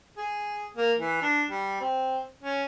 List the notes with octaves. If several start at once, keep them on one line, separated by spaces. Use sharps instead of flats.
G#4
A#3
E3
D4
G3
C4
C#4